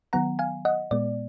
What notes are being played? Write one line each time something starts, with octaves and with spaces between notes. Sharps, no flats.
D#3 F#3 B3 F#5 A#5
F5 G#5
D#5 F#5
A#2 G#3 B3 D5